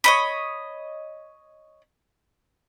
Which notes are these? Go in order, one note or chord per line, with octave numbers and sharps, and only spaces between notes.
C#5 D#5 B5